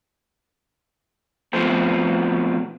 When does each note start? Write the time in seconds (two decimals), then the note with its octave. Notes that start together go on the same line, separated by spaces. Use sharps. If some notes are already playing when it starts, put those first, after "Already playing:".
1.53 B2 F3 A3 B3 C4